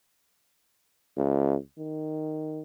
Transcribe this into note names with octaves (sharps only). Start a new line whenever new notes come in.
C#2
D#3